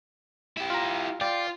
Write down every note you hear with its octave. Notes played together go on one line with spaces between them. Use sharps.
E4 G4
F4 A#5
F4 D5 G5